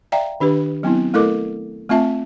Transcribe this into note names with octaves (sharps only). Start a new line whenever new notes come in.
D5 E5 F5 G5 A#5
D#3 D4 G4 B4
F#3 B3 C4 E4
A3 E4 A4 A#4 D#5 D6
A3 C4 F4 E5 A5